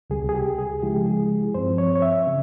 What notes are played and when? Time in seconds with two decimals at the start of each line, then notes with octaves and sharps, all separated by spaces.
0.10 C#2 C3 G3 G#4
0.29 G#4
0.35 G4
0.59 G#4
0.82 C#3 F3 G#3 E4 G4
1.06 G#4
1.55 G2 F3 C4 C5
1.78 C#5
1.95 C#5
2.02 E5
2.27 C#3